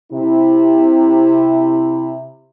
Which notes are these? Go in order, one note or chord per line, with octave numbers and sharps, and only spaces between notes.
C3 E4